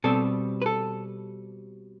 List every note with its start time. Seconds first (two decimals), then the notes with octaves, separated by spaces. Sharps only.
0.04 B2 G3 C4 A4
0.62 B4
0.66 A4